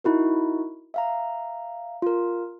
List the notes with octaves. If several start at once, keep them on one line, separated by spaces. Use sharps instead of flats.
D#4 E4 F#4 A#4
E5 F5 A#5
F4 A#4